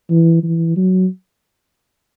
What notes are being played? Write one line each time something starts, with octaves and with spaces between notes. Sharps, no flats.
E3
E3
F#3